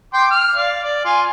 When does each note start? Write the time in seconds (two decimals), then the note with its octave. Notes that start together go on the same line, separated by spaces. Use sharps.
0.14 G5 C6 D6
0.31 F6
0.55 D5 F5
0.84 D5
1.05 F4 G#5